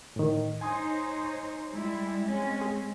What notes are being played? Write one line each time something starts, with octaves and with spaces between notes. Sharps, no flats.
A2 D#3
D#4 C5 C#5 G#5 C6 D#6
G3 G#3 E4
G#3 C4 C#4
G#4